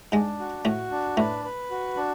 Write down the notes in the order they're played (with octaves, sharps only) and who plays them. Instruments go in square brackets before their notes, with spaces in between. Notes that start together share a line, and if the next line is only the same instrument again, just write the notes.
[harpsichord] G#2 G#3 [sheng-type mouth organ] D4
[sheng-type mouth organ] F#4
[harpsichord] A2 A3 [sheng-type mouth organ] F#4
[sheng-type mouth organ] D4
[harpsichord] A2 A3 [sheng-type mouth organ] B4
[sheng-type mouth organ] B4
F#4
D4